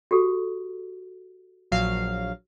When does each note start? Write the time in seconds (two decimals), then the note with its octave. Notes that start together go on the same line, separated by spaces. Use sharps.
0.11 F#4 G4 A4
1.72 A#1 F#3 F5